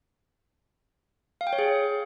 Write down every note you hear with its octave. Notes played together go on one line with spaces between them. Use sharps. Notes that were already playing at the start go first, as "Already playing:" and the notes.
F5
G5
C#5
G#4